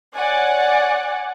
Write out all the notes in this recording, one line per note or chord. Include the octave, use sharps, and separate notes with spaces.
C#5 D5 F#5 G#5